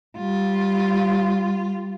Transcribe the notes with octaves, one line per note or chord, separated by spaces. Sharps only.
G3 F4